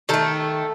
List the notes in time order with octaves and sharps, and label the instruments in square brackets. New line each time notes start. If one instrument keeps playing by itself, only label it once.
[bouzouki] D#3 A3 A4